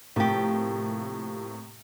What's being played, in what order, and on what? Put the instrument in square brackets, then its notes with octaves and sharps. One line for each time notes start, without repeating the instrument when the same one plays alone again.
[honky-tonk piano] A2 C3 A#3 [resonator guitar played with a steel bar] F3 G4